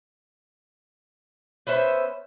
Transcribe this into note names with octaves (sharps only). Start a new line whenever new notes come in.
B3 C#4 C5 E5